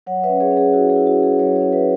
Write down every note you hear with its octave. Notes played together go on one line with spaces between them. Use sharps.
F#3 C#5 F#5
B4 E5
C#4
G#4 C#5
C#4
G#4
E4 F#4
G#4
E4
F#4
C#4
G#4
F#3 G#4 C#5
G#4 C#5
C#4
B4 E5